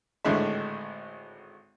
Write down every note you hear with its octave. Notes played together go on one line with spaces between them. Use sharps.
G#1 A2 D3 G#3 E5